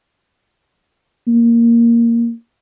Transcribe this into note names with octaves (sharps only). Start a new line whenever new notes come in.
A#3